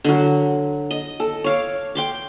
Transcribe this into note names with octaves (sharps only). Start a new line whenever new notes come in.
D3 F#3
D#5
A4
C#5 F5 D6
G5 C6 D6